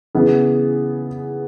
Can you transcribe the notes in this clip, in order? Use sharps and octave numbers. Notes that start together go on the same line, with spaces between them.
C#3 E3 B3 G#4